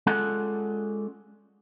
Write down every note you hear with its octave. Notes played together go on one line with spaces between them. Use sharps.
G#3 C#4 F4 A4 D5 F#5